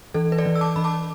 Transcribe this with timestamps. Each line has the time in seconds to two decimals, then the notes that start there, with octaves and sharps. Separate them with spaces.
0.14 E3 A4
0.32 B4
0.38 A4 D5
0.46 E3
0.55 E6
0.61 A5 D6
0.76 E3 B5
0.84 A5 D6